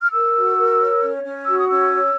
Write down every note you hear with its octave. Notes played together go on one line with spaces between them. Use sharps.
F6
A#4 E6
F#4
A#4
C#5
C#4
C#4
F#4 E6
D#6
C#4 E6
C#5